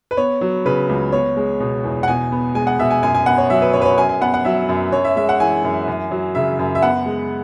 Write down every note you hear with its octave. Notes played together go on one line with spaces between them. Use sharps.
B4
B3 C#5
F#3
C#3 B4
C#2
B3 C#5
G#3
B2
E2
F#5
B2 G#5
B3
G#3 G#5
F#5
B2 E5
G#5
F#2 G#5
G#5
B3 F#5
C#5
F#3 E5
B4
F#2 C#5
B4
C#5
F#2 G#5
G#5
B3 F#5
F#5
F#3 E5
F#2
F#2 C#5
E5
G#3 E5
F#5
E3 G#5
F#2
F#2
F#3
C#3 E5
F#2
E5
B3 F#5
G#3